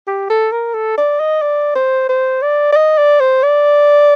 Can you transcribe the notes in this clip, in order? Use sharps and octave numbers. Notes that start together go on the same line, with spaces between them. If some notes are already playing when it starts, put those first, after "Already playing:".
G4
A4
A#4
A4
D5
D#5
D5
C5
C5
D5
D5
D#5
D5
C5
D5